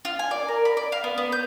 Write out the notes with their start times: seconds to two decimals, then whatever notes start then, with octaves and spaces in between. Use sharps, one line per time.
0.05 F4
0.19 G#5
0.31 D5
0.48 A#4
0.65 B5
0.77 D5
0.92 F5
1.04 B3
1.18 B3
1.32 G6